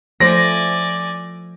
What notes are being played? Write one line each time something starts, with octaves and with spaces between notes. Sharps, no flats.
F3 A3 C5 D5 G#5 A#6